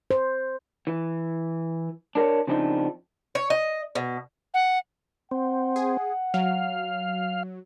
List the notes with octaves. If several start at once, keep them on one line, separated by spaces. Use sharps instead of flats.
C5
E3
D4 A#4 B4 C#5
C#3 F3 C4 D4 D#4
C#5
D#5
B2
F#5
C4 F#5
G#4
F#3 F5